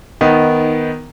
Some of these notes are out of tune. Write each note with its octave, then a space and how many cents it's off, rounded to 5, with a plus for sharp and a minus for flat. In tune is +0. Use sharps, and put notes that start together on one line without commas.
D#3 +0 B3 +0 D#4 +15